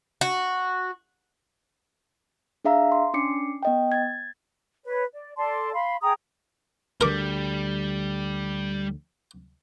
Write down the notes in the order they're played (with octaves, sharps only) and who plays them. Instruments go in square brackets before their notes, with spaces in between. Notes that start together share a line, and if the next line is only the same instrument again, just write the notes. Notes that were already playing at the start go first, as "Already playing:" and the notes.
[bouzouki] F#4
[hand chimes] D4 G#4 E5 F5 A#5 E6
C6
C#4 D4 D6 C7 C#7
B3 D#5 G5
G#6 A6
[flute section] B4 C#5
D5
A4 D5 A5 C6
F5 B5 C6
G#4 G5 A#5 D#6
[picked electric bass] D2 D3 [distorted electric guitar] G3 [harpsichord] A#4 D6